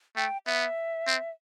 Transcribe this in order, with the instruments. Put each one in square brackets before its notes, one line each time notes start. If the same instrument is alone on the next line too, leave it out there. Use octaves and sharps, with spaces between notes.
[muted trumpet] A3 [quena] G5
[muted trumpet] B3 [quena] E5
[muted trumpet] C4